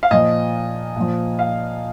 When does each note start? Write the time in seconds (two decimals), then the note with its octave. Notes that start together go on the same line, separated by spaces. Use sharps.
0.03 F5
0.11 A#2 F3 D#5
0.96 A#2 F3
1.39 F5